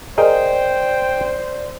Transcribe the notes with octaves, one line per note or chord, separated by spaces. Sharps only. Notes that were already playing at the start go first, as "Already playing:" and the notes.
G#4 A#4 C5 D5 D#5 G5